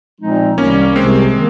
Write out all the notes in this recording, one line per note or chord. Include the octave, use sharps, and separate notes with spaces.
A#2 F3 G#3 C4 D#4
C2 C3 D#3 G3 A#3 C#4
C2 C3 D#3 G#3 C4
D#3 A#3